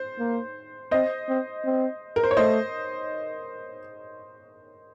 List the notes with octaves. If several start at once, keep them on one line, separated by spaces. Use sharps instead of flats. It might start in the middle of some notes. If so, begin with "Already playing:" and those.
Already playing: C5
A#3
C4 C5 D#5
C4
C4
A#4
C5
C#5
A3 C5 D#5